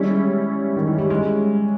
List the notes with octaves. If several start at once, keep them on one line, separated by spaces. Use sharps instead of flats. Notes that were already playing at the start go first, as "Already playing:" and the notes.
Already playing: G3 G#3 C#4 E4
D#3
E3
G3
G#3